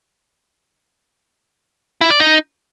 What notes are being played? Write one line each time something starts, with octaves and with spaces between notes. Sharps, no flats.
E4
D5
D#4